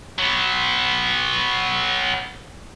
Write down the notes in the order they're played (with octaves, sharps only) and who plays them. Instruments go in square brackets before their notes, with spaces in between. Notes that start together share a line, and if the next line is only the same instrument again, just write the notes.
[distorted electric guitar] F#3 B3